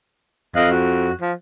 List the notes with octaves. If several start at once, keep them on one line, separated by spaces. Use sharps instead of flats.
F2 D#5 F5 F#6
F#4
F3